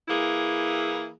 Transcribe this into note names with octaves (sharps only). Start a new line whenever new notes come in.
E3 A#3 E4 G#4